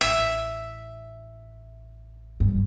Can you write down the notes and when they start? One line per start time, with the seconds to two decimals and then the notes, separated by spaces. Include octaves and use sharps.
0.01 A1 E5
2.40 G2